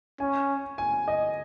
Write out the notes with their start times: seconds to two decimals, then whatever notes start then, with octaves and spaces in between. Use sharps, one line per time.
0.20 C#4 G#5
0.78 G#5
1.08 D#5